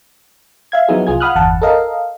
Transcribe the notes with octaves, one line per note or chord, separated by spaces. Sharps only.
E5 F5 G#6
F3 F#3 B3 D#4 E4 G#4
C2 F4 G#4 G#6
F5 F#5 B5 D#6 F6 F#6
G1 E2 F#5 A5
A4 A#4 D#5 F5